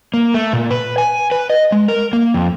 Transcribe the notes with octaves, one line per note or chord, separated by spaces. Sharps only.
A#3
A3
A#2
B4
G#5
B4
D#5
G#3
A#4
A#3
F2